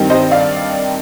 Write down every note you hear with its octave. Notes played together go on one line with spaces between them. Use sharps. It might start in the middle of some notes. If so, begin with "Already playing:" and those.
Already playing: G2 D#3 G3 C4 D#4
C5 D#5
D5 F5